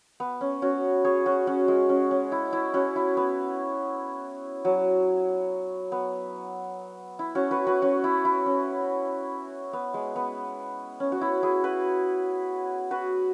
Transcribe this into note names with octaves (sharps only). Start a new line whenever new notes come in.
B3
C#4
C#4 F#4
G#4 C#5
C#4 F#4
C#4 F#4
G#3
C#4
C#4
E4
E4
C#4 F#4
E4
B3
F#3
B3
E4
C#4 F#4
F#4 B4
F#4 B4
C#4 F#4
E4
E4
C#4
B3
G#3
B3
C#4
F#4
E4
E4 G#4
F#4 B4
F#4 B4